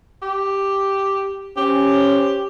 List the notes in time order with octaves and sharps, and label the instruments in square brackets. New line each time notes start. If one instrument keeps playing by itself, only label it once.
[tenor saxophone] G4
[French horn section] C#4 C5 [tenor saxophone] G4